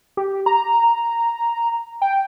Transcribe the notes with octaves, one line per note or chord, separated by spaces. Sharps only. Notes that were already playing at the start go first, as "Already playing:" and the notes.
G4
A#5
G5